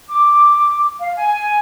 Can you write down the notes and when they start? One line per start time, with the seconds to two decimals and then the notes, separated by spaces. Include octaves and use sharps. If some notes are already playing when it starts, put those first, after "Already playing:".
0.09 D6
1.00 F5
1.16 G#5